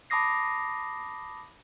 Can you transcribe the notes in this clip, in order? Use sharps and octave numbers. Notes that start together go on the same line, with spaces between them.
A5 B5 D6 D#6 A#6 C7